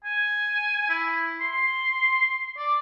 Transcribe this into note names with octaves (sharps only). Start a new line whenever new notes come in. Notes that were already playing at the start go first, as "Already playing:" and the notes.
G#5
E4
C6
D5